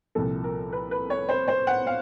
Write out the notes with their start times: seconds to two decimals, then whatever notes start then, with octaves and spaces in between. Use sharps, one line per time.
0.15 C2 A#2 F3 A4
0.44 A#4
0.73 B4
0.91 B4
1.10 C#5
1.29 C5
1.48 C5
1.67 F#5
1.87 F5